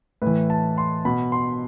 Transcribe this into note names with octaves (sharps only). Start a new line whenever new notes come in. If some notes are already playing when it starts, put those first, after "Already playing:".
A2 B4
E3
A5
C6
B2 B5
C6